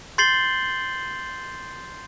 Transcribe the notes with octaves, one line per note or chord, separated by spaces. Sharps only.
C6 G6 A6 C7 F#7 G7